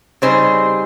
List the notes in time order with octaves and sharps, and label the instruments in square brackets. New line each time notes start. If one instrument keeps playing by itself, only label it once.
[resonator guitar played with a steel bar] C#3 G3 C4 D#4 G#4 C5